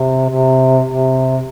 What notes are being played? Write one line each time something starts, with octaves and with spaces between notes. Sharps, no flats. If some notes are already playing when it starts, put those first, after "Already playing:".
Already playing: C3
C3
C3